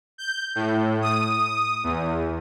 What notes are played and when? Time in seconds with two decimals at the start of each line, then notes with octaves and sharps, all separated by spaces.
0.18 G6
0.55 A2
1.02 D#6
1.84 E2